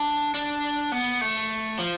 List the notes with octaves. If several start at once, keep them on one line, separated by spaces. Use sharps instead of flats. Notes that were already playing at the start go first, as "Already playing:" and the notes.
Already playing: D4
D4
B3
A3
F3